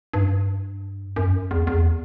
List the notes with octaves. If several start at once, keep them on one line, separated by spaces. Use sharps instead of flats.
G2
F#2
E2
E2